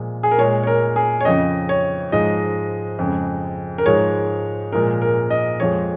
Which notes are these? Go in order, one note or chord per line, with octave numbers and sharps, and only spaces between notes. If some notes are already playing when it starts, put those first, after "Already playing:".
Already playing: A#2 F3 G#3
G#4
A#4
A#2 G#3 C#5
C#5
A#4
G#4
C#5
F2 C#3 F3 D#5
C#5
G#2 F3 G#3 D#5
F2 C#3 G#3
A#4
G#2 F3 G#3 C#5
A#2 F3 G#3 A#4
A#4
D#5
F2 F3 G#3 C#5